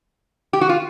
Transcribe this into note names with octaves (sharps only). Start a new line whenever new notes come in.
G4
F#4
F4